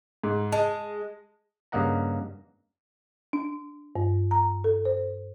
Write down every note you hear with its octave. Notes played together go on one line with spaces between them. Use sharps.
G#2
G#3 A5
G2 C#3 A#3 D#5 F#5 A#5
D4
G2
A#5
A4
C5